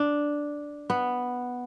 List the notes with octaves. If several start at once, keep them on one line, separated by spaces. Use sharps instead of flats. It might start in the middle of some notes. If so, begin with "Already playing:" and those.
Already playing: D4
B3